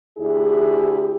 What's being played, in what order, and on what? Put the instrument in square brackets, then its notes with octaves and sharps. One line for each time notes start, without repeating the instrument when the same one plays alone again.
[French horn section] D2 E4 G4 G#4